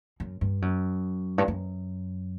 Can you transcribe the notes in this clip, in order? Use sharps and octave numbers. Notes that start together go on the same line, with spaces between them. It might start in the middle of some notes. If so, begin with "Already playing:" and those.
F#2
G2
F#2
G2
F#2